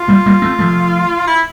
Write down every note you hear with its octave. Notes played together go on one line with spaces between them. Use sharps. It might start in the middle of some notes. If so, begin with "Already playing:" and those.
Already playing: F4
G3 A#3
G3 A#3
A3 C4
F3 A3
E4